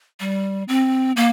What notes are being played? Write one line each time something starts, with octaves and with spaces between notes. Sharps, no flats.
G3
C4
A#3